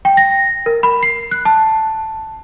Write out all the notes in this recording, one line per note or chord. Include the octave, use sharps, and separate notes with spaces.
G5
A#6
A#4
B5
C7
F#6
A5